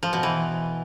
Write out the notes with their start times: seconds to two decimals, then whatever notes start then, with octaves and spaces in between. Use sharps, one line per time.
0.03 F3
0.13 B2
0.23 E3